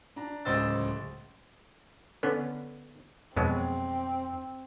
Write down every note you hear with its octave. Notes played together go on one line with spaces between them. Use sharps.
D4 A#5
D1 C#2 C5 D#5 E6 A6
D3 B3 C#4
F2 B2 F#3 G#3 C4